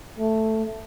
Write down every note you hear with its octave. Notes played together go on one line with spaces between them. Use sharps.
A3